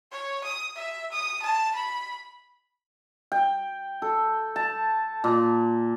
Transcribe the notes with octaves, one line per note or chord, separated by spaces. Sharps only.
C#5
D#6
E5
D#6
A5
B5
G5
A4
A5
A#2